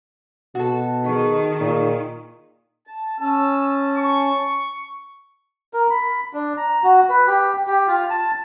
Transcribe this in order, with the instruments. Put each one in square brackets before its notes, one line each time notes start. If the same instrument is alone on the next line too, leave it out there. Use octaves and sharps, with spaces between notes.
[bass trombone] B2 [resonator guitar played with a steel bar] F#4 A4
[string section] D#3 [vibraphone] G#4 D#5 C#6
[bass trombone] A#2
[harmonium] A5
[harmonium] C#4 A5 [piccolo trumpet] E6
[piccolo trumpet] C#6
[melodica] A#4
B5
D4
A#5
F#4
B4
G4
G4
F4
A5